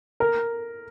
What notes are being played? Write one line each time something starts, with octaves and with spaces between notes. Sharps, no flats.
A#4